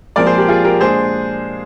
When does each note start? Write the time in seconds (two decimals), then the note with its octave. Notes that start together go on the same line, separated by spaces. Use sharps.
0.16 A#2 F3 G#3 C4 A#4 D5
0.26 G#4 C5
0.38 G4 A#4
0.48 F4 G#4
0.64 G4 A#4
0.80 A#2 G#3 D4 G#4 C5